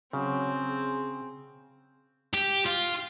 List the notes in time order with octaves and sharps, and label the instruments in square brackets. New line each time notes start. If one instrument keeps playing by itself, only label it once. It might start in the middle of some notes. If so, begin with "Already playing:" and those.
[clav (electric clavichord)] C#3 [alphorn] F#3 [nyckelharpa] C4
[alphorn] G#4
[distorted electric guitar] G4
F4